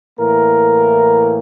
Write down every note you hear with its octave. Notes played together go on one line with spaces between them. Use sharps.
A2 E3 A#3 A#4